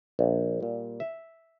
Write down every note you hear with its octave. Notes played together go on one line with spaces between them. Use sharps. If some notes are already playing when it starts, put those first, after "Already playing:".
A#1
A#2 G3
E5